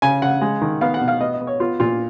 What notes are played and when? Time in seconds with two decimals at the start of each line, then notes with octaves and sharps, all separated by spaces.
0.02 C#3 G#5
0.22 C#3 F#5
0.41 G#3
0.61 D#3
0.81 B3 F5
0.94 F#5
1.01 B2
1.08 F5
1.21 B3 D#5
1.34 D#5
1.41 B3
1.47 C#5
1.60 B3 F4
1.80 A#2 F4